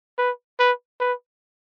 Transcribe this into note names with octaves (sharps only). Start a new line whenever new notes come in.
B4
B4
B4